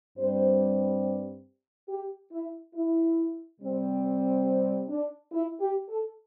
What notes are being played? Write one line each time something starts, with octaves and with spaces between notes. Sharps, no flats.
G2 G3 C4 C5
G4
E4
E4
C3 G3 C4
D4
E4
G4
A4